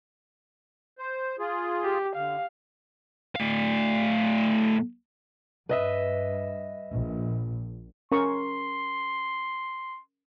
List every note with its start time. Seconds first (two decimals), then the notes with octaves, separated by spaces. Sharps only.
0.99 C5
1.39 F4 G#4
1.83 G4
2.16 D3 F5
3.35 A2 F5
5.69 G2 B4 D#5 E5
6.92 A#1
8.12 C#4 A#4 C6 C#6